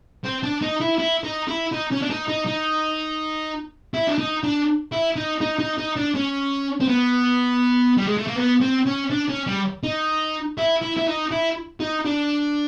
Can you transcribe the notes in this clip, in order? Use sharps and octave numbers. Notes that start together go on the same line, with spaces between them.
C4
D4
D#4
E4
E4
D#4
E4
D#4
C#4
D4
D#4
D#4
D#4
E4
D4
D#4
D4
E4
D#4
D#4
D#4
D#4
D4
C#4
C4
B3
G3
G#3
A3
A#3
B3
C4
C#4
D4
C#4
G3
D#4
E4
E4
E4
D#4
E4
D#4
D4